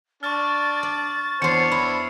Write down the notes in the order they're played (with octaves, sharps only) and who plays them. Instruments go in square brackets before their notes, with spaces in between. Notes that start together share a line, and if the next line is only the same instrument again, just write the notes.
[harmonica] D4 [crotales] C#6 F6 [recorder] A6
[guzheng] D5
[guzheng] E2 C5 [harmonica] D4 C#5 [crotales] C7 C#7
[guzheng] E4